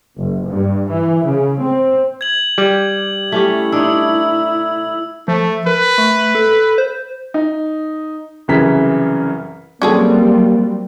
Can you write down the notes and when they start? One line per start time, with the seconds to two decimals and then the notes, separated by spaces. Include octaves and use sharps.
0.17 F#1
0.47 G2
0.89 E3
1.27 C#3
1.62 C4
2.21 G#6 F#7
2.58 G3 G4
3.32 A3 C#4 E4 G4
3.73 D4 D#4 C#5 E6
5.28 F3 A3
5.66 A#4 B4
5.98 A3
6.35 A4
6.78 C5
7.34 D#4
8.48 C2 F#2 C#3 E3 B6
9.82 F#3 G3 A#3 C4 C#4 G#4 A4